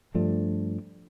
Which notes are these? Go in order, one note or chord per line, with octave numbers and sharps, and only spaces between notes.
G2 F3 A3 D4